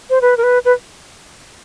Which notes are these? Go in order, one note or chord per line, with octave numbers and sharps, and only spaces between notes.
C5
B4
A#4
B4
B4